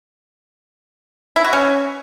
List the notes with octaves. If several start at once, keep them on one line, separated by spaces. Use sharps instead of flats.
E4
F#4
C#4